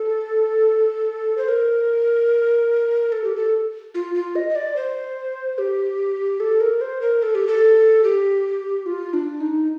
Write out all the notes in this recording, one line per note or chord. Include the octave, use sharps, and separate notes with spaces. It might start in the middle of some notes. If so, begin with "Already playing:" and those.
Already playing: A4
C5
A#4
A4
G4
A4
F4
F4
D#5
D#5
D5
C5
G4
A4
A#4
C5
A#4
A4
G4
A4
G4
F4
D4
D#4